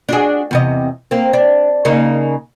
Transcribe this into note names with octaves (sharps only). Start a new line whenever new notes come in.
D4 F#4 G#4
E2 C3 D#5
A#3 C4
D4
C#3 A#3 D#4